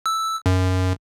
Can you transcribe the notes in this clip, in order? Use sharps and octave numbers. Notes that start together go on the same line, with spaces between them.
E6
F#2